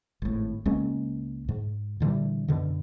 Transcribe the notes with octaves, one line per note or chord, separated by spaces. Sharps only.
G#1 A2
C#2 G#3 A#3 C#4
G#2
A#2 D3 E3 G3
F#2 B2 D3